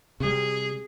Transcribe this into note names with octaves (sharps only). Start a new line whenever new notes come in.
C3 G3 G#4